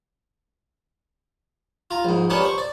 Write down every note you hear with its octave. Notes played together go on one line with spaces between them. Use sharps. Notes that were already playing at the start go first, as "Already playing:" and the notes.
F4 A#5
A#1 G#2
B3 C#4 D4 G4 A#4 F#5
C5 C#6
D5